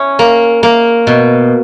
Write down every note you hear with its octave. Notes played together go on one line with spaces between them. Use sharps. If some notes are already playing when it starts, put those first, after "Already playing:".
Already playing: C#4 E4
A#3
A#3
B2